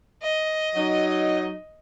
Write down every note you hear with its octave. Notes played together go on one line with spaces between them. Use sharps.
D#5
F#3 D#4